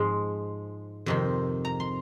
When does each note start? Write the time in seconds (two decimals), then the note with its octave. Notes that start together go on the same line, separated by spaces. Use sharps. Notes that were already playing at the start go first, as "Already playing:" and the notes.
Already playing: G#2 F3 G#3 C6
1.06 F2 C3 D#3
1.65 A#5
1.80 C6